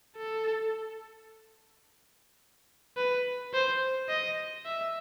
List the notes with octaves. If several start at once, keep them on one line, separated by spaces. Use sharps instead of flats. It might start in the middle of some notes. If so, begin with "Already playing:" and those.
A4
B4
C5
D#5
E5